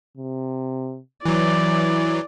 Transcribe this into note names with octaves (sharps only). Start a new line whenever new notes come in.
C3
E3 F#3 E4 D5